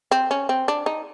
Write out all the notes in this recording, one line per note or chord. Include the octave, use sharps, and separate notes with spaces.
C4
C#4
C4
D4
D#4